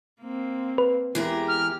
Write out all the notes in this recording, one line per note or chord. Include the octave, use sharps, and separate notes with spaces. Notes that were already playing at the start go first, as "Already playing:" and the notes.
A#3 C4
B4
E2 E3 G#3 G4 A#4
F6